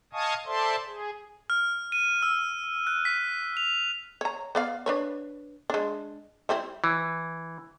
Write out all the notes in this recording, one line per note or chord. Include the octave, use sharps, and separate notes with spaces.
D#5 F5 G#5 A5 C#6 D#6
A4 C5 D5 E5 A5 C6
G#4
F6
D#7
E6
F#6
B6
F7
C#5 A#5
B3 D5 F5
D4 B4 C#5
G#3 D4
G3 C4 E4
E3